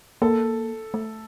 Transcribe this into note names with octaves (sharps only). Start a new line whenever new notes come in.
A#3 A4
A3